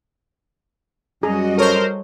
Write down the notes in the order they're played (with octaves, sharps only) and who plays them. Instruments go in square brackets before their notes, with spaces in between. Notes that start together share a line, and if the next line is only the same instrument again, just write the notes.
[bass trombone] F#2 [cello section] G3 F#4 D#5 [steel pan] G#4 A#5
[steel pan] A4 C#5 [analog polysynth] A#4 C5